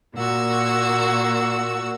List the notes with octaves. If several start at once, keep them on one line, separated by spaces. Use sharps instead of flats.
A#2 A#3 F#4 E6